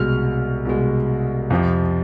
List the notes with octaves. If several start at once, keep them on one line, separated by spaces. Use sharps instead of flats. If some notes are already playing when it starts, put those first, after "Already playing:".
Already playing: C2 B2 G#3 F6
C2 B2 G#3
F2 C3 F3